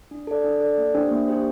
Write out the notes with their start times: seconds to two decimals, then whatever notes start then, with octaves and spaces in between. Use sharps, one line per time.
0.11 D4
0.27 A4 D5
0.44 D4
0.61 A4 D5
0.78 A#3
0.94 D4 G4 C5 G5
1.11 A#3
1.28 D4 G4 C5 G5